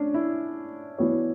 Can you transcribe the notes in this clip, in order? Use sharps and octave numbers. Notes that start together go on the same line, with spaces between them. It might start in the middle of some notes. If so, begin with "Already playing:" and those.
Already playing: C#4 D4
E4
E3 B3 F#4 C#5